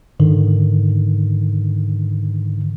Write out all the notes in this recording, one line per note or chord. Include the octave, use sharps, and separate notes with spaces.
G#2 D3 D#3